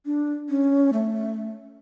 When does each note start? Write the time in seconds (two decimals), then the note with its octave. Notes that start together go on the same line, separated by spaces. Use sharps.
0.06 D4
0.49 C#4
0.93 A3